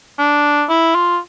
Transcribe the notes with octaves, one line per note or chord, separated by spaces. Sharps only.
D4
E4
F4